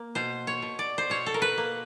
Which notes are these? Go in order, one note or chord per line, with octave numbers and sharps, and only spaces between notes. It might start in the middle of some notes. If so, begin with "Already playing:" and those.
Already playing: A#3
B2 C5
C#5
B2
D5
C5
B2 C#5
A4
A#4
B4
A#3